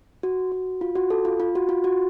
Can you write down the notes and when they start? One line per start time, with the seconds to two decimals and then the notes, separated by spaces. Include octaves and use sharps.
0.23 F#4
0.52 F#4
0.81 F4
0.96 F#4
1.10 A4
1.25 F4
1.40 F4
1.55 F#4
1.69 F4
1.84 F#4